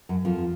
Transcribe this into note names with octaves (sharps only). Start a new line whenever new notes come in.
F#2 F#3
F2 F3